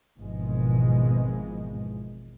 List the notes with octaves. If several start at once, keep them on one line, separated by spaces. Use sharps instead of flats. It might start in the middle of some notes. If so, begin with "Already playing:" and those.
G#1 E2 G#2 B2 F3 G#3